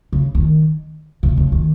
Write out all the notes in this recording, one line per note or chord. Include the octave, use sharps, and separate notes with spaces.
C#3
D#3
C3
C#3
D#3